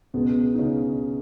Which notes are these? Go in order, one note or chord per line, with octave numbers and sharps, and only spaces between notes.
C#2 B2 G#3 B3
D#4
C#3 C#4